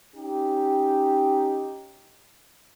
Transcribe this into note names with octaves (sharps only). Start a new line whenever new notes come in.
C#4 D#4 G4